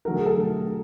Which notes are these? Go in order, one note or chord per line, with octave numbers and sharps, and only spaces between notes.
D3 F#3 A3 A#4
G#4
A4
D3 F#3 A3